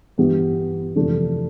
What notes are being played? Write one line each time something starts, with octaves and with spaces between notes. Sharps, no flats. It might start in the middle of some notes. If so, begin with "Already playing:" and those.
G2 E3 G3 B3
F2 C3 E3 A3 D4